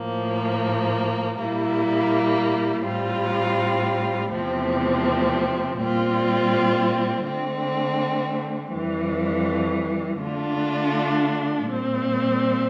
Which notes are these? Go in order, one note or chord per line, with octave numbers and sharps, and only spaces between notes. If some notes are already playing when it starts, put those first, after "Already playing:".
Already playing: A2 F3 A#3
A#2 G3 A#3 E4
A2 G3 C4 F4
E2 C3 F3 A3 C4
A#2 G3 C4 F4
D3 A3 C4
F2 E3 G3
D3 A3 D4 F4
A#2 G3 C4